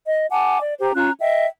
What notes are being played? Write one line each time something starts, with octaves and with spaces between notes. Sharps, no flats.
D#5
F#5 G#5 A5 D6
D5
G4 C5 A#5
C#4 F4 A#5 F#6
D#5 E5 G5